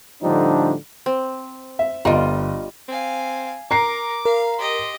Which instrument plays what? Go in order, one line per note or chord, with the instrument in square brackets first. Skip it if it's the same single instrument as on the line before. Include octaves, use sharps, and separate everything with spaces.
[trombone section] A2 D3 F3 G3 D4 D#4
[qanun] C4
[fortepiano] E5
[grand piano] G1 [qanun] G3 F4 [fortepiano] D#5 A#5
[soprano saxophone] C4 [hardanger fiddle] F5 G#5
[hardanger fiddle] A#4 [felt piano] A#5 C7 [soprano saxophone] D6
[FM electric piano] A#4 [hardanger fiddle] F5
[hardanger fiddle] G4 D#5 [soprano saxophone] C6